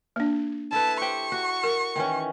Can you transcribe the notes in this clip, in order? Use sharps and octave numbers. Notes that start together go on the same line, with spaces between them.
A#3 D4
E4 A4 B4 A5
G4 C5 G5 C#6
F#4
A#4
D#3 E3 C#4